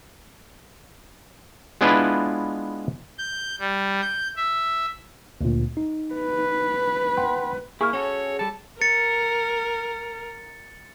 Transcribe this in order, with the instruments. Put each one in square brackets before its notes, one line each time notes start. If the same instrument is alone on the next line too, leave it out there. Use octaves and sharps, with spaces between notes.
[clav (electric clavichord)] G#3 B3 D4 E4 F4 B4
[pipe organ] G6
G3
G6
E5
[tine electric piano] D2 A#2
D#4
[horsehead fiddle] B4
[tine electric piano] F#5 G5 C6
[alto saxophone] A#3 [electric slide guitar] E4 [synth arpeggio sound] G#4 [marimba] C#6 F6
[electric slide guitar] C#4 F#4 A4 [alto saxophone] C#5
[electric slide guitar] G3 A4 [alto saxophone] A5
[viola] A#4 [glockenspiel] A6 C#7